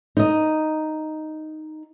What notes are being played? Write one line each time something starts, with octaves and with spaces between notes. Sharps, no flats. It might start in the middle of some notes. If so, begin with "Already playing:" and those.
D#4 D#5